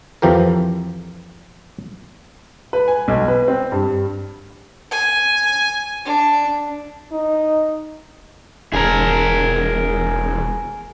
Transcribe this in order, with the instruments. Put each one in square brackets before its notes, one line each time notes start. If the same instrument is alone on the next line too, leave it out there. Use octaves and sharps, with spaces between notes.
[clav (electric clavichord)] F2 E3 F3 G4 A#4
[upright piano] B4
G#5
B1
B4
C4
G2
[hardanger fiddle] G#5
D4
[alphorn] D#4
[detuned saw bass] E1 [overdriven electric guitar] G#4 A#4